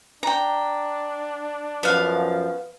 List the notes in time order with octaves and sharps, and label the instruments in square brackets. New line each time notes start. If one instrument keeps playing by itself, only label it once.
[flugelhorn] D4 [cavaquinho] G5 A#5
[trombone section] F#2 F3 [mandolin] B3 F5